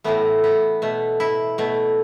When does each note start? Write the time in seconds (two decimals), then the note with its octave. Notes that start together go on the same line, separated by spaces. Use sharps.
0.04 A2 E3 A3 B3
0.44 B3
0.82 B2 A3
1.20 E4
1.58 B2 A3